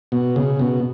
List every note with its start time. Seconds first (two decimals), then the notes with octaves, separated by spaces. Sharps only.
0.12 B2
0.36 C#3
0.60 B2